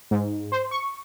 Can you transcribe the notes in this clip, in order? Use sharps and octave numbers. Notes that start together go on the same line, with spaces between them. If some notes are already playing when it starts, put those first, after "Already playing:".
G#2
C5
C#6